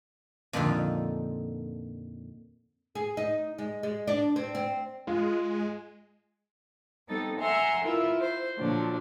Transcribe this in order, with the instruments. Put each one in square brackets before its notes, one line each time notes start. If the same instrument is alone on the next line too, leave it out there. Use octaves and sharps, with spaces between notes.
[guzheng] F2 A#2 D3 D#3 F3
[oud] G#4
D#4
G#3
G#3
D4
C4
C4
[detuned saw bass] G#3 [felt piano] F4
[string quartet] G3 B3 C4 D#4 A4 A6
E5 F#5 G#5 A#5 C6
E4 F4 A#4 B4 E5
C5
A#2 D3 F3 F#3 D4